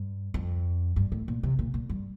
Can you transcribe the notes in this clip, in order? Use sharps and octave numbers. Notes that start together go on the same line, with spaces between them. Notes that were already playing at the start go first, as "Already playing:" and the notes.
Already playing: G2
F2
G2
A2
A#2
C3
A#2
A#2
G2